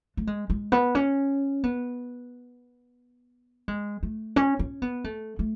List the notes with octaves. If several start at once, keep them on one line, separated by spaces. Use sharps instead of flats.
A3
G#3
G#3
B3
C#4
B3
G#3
A3
C#4
C#4
B3
A3
A3